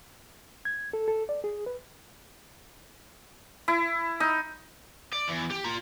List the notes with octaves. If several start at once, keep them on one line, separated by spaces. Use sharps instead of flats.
G#6
A4
A4
D5
G#4
B4
E4
D#4
D5
E2
G4
F4 A#5